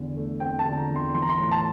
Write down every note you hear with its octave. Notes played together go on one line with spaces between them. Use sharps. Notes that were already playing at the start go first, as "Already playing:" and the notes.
Already playing: E2 D3
A3
C4 G5
A5
D3
A#5
E2
C6
E3 C6
A#5
C6
A2
A5